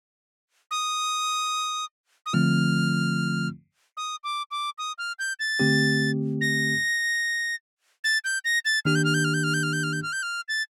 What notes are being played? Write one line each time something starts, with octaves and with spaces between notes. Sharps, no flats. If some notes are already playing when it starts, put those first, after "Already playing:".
D#6
D#6
D3 F3 A3 C4 F4 F6
D#6
D6
D6
D#6
F6
G6
A6
D3 A3 C4 G4
A#6
A6
G6
A#6
A6
D#3 A#3 D4 G4 F6
G6
F6
G6
F6
G6
F6
G6
F6
G6
F6
G6
F6
G6
F6
A6